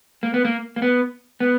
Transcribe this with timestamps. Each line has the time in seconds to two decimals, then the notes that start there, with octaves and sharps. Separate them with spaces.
0.23 A#3
0.34 B3
0.45 A#3
0.76 A#3
0.82 B3
1.40 B3